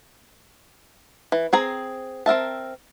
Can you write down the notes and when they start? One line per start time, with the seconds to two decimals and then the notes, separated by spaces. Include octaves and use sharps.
1.32 E3
1.53 C4 G#4 A#5
2.26 C4 A#4 E5 A5